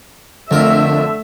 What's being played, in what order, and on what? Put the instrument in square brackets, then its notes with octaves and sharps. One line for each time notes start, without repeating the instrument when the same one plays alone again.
[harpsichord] F2 A#4 [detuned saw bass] D3 [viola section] A3 E5